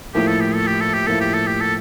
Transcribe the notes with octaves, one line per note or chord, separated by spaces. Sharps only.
A2 F3 A#3 E4 G4
A4
G4
A4
G4
A4
G4
A2 F3 A#3 E4 A4
G4
A4
G4
A4